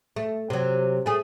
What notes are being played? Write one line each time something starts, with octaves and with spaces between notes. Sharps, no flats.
A3
C3 F#3
A3 G#4